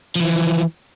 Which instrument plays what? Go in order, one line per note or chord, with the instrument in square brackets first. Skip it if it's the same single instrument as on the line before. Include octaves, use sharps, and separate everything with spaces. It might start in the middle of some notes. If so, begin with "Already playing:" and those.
[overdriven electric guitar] E3 F3